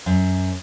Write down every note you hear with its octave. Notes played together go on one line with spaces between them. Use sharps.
F#2